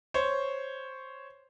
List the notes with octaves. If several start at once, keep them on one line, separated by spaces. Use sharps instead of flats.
C5 C#5